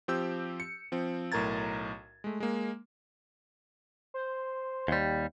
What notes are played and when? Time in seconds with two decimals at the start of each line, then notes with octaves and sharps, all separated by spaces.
0.08 F3 C4 G4 E6 G6
0.60 C#7
0.92 F3 C4
1.32 B1 A2 A#4 A#5 G#6 A6
2.24 G#3 A3
2.40 G#3 A#3
4.14 C5
4.88 D#2 G3